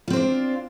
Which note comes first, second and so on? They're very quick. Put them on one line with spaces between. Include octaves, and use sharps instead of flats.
F4 C4 C5 D4